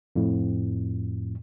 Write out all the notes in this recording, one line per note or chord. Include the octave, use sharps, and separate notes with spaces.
F2 A2